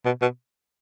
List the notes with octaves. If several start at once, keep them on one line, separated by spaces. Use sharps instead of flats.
B2
B2